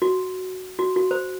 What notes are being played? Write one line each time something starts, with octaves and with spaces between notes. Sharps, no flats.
F#4
F#4
F#4
C5